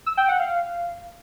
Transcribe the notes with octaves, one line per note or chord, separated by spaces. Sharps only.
E6
G5
F#5
F5